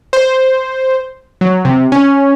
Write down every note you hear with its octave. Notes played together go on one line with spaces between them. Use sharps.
C5
F#3
C3
C#4